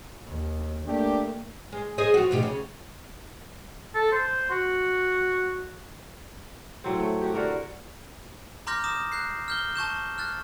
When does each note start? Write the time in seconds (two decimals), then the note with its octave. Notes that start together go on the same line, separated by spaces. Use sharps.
0.24 D#2
0.86 A3 A#3 D4 G4
1.72 G#3
1.98 G#4 C5 D#5
2.14 F3 F#4
2.31 D2 B2 G4
2.43 C#3
3.95 A4
4.12 C5
4.51 F#4
6.84 A2 F#3 C4
7.00 A3
7.21 F#4 G4
7.34 D3 F#4 A#4 E5
8.67 A#5 C6 D6 F6 G6 A#6
8.84 A#5 D6 D#6 E7
9.12 F#6 G6 C7
9.48 F6 G6 G7
9.75 A5 C#6 G6 E7
10.18 F6 F#6 A6